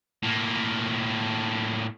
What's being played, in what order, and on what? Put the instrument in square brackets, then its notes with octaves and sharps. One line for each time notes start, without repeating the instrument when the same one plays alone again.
[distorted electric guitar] A2 A#3